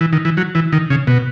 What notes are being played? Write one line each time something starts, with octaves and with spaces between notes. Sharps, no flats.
E3
D#3
E3
F#3
E3
D#3
C#3
B2